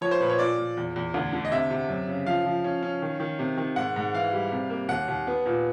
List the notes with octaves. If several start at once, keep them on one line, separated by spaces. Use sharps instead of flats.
F3 C#5
C5
A#2 B4
C#5
A#2 D5
A#2
E2
E2
D2
D3
D#5
C3 E5
C3
F#2
C#3
F3 F5
F3
C#4
C#4
D#3
D#3
C3
D#3
G#2 F#5
G#2
E3 F5
G3
C3
A#3
D#2 F#5
D#2
B3
A#2